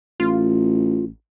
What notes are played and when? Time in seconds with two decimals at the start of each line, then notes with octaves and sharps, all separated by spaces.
0.20 A1 F4